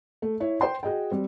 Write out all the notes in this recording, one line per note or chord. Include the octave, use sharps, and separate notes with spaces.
A3
E4 C#5
C5 G5 C6
F#4 G#4 D#5 G5
G3 C4